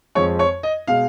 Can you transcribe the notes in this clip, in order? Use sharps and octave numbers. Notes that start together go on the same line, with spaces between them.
F2 F3 G#3 C#5
C#5
D#5
B2 G#3 F5